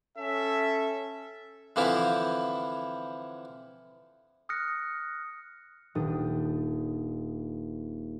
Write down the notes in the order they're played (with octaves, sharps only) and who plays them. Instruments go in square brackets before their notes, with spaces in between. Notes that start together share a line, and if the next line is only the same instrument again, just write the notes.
[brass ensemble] C#4 A4 E5
[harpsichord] D3 E3 F3 C4 E4
[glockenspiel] D#6 F6 F#6 A#6 C#7
[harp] D#1 D4 G5 D#6 D#7